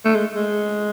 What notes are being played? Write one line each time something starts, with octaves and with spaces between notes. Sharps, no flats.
A3
G#3
G#3